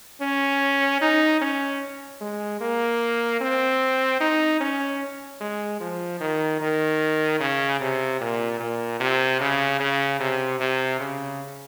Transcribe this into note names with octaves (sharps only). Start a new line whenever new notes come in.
C#4
D#4
C#4
G#3
A#3
C4
D#4
C#4
G#3
F3
D#3
D#3
C#3
C3
A#2
A#2
C3
C#3
C#3
C3
C3
C#3